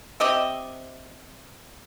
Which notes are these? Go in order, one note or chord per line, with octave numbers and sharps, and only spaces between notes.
C4 G4 D#5 E5